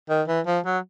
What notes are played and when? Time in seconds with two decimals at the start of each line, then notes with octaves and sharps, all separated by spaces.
0.09 D#3
0.28 E3
0.46 F3
0.65 F#3